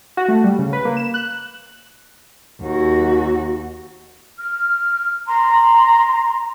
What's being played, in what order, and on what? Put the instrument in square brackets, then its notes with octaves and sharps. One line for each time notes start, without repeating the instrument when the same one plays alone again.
[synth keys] F#4
A3
G3
C#3
B4
A#3
E7
F#6
[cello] D#2 F#4
[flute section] F6
A#5 C6